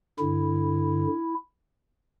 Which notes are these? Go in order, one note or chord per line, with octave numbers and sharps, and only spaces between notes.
G2 D3 E4